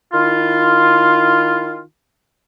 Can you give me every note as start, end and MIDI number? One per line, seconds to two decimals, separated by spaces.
0.12 1.79 51
0.12 1.79 64
0.12 1.79 65